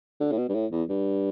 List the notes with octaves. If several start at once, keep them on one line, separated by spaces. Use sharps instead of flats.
D3
A2
B2
G2
A2
E2
G2